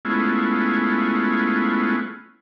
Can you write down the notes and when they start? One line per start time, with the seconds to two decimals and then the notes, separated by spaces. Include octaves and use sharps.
0.05 G#3 A3 B3 C#4 E4 F4